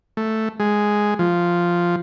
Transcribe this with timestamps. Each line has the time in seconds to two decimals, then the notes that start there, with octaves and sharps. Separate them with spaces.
0.17 A3
0.60 G#3
1.19 F3